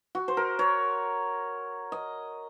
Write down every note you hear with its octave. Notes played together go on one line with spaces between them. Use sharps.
F#4
C5
A#4
C#5
D#5